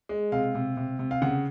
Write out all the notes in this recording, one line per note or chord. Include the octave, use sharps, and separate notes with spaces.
G#3
C3 F5
C3
C3
C3
F5
C#3 F#5